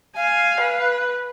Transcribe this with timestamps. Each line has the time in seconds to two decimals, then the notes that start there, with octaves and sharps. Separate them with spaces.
0.16 F5 G#5
0.60 B4